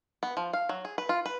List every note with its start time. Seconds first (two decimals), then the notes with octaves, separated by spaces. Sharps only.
0.23 B3
0.37 F3
0.53 F5
0.69 F#3
0.85 G#4
0.98 B4
1.09 F4
1.26 B4